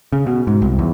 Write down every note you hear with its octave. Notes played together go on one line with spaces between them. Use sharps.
C#3
B2
G#2
C2
E2